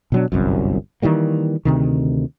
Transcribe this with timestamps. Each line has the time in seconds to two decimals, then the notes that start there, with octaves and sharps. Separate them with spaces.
0.12 B2 F#3 D4
0.32 G1 C2 F#2
1.02 D#3 E3 G3 A#3
1.65 D2 C3 D#3